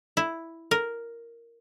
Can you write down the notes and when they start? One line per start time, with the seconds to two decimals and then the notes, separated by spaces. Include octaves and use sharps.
0.17 E4
0.71 A#4